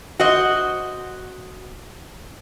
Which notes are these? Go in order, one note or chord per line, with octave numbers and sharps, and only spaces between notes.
F#4 C5 D#5